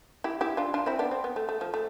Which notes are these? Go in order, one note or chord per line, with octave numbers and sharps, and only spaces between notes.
E4 G4
E4 G4
D4 F4
D4 F4
C4 E4
B3 D4
C4
B3
A3
A3
F3
A3